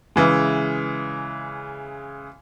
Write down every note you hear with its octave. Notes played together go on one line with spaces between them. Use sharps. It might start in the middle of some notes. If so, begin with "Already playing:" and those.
C#3 E3 G#3